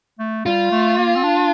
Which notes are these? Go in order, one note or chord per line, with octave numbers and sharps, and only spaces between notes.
A3
G3 F4
A3
A#3
C4
D4